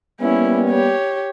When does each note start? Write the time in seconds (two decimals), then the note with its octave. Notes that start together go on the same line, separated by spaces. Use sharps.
0.21 G3 A#3 B3 C#4 E4
0.69 G4 C#5